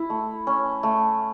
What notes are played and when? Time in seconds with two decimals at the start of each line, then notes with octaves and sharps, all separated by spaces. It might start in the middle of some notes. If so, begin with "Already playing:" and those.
Already playing: E4
0.10 A3
0.47 C#4
0.83 A3